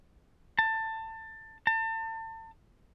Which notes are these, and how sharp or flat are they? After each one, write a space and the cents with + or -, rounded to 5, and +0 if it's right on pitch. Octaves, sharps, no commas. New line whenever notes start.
A5 +20
A5 +35